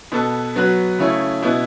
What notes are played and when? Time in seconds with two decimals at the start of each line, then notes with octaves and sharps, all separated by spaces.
0.12 B2 B3 A4
0.55 F#3 B3 F#4 B4
0.99 C#3 A3 C#4 E4
1.43 B2 B3 E4